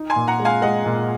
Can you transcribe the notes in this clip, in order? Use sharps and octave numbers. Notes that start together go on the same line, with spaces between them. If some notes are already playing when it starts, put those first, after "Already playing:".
Already playing: D#4
G#5 C6
A#2
F#5 A#5
G#3
F5 G#5
G#3 D#5 F#5
A#2